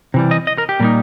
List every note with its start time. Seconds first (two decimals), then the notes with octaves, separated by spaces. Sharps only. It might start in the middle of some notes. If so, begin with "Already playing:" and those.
0.14 C3 E3 G3
0.31 D#5
0.47 D#5
0.58 A#4
0.69 G4
0.80 A#2 G3 A#3 D#4